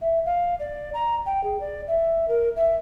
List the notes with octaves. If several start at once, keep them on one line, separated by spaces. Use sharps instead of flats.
E5
F5
D5
A#5
G5
G#4
D5
E5
A#4
E5